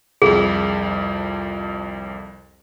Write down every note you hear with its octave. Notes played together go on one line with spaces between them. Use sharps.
C2 F2 G#4